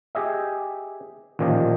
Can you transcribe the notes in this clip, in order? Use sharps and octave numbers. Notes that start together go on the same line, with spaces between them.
G4 G#4 D#5 E5
A1 A#2 D#3 F3 G4 D#5